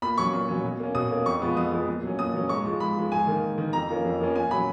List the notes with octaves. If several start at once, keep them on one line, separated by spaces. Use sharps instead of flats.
A#2 B5
F#3 C#4 C#6
A#2
F#3 C#4
B2
A#3 C#4
B2 D#6
A#3 C#4
F2 C#6
F3 G#3 B3
F2 D#6
F3 G#3 B3
A#2
F#3 C#4
A#2 D#6
F#3 C#4
G#2 C#6
F3 G#3
G#2 B5
F3 G#3
G#2 G#5
D#3 A#3
G#2
D#3 A#3
F2 A#5
F3 A#3 C#4
F2
F3 A#3 C#4
A#2 G#5
F#3 C#4 B5